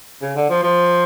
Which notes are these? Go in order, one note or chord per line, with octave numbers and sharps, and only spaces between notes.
C#3
D3
F3
F3